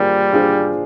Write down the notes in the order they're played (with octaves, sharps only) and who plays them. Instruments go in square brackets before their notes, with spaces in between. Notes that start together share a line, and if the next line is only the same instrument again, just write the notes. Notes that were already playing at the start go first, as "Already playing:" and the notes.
Already playing: [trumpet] G3 [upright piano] A#3 D4 F4 G#4 C5
[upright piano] D4 F4 G#4 C5